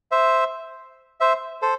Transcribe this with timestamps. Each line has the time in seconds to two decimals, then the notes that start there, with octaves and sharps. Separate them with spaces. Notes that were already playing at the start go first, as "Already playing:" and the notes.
0.11 C5 E5
1.20 C5 E5
1.62 A4 C5